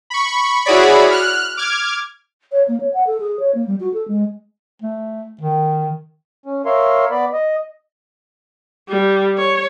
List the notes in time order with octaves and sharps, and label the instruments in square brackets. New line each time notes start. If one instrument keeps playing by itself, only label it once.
[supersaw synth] B5 C#6
E4 F#4 G#4 C#5 D5 B5
F6 F#6
D6 F6 G#6
[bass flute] C#5
A#3
C#5
F#5
A4
G#4
C#5
A#3
G3
F#4
A4
G#3
[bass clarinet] A3
D#3
[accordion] C#4
A#4 C#5 E5 F5 C6
B3 D5 B5
D#5
[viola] G3
C#5